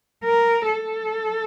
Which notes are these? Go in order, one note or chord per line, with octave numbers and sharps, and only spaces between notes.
A#4
A4